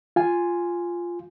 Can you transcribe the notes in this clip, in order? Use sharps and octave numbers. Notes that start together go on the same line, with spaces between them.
F4 G#5